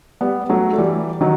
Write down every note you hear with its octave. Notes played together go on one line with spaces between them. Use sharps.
G3 B3
F#3 A3
A3
E3 G3
D#3 F#3